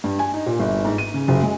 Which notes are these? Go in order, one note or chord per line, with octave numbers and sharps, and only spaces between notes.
G2
G#5
D#4
A#2
G1
G#2
D#7
C#3
F#1
G#3